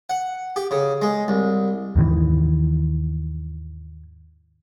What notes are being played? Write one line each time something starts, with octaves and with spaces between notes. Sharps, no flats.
F#5
G4
C#3
G#3
C2
D#2 G#2 D#3 E3